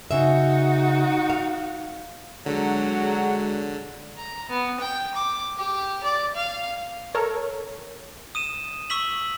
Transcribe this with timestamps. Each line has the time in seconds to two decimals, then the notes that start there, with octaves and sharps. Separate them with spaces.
0.11 C#3 D#4 F#4 E5
1.30 F5
2.46 D3 F#3 G#3 D4 G#4
4.18 A#5
4.49 B3
4.80 G5
5.15 D6
5.57 G4
6.03 D5
6.35 F5
7.15 A4 A#4 C#5
8.35 D#6 D#7 E7
8.90 C#6 E6 B6 F#7